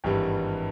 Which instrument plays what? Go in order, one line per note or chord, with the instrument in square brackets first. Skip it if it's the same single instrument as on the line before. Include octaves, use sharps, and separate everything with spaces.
[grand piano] G#1 G2 E3 G3